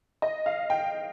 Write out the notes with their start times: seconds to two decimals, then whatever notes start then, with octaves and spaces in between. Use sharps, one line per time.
0.22 D#5
0.46 F5
0.70 G5